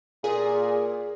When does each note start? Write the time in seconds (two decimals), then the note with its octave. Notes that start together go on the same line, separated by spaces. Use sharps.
0.24 A#2 G#4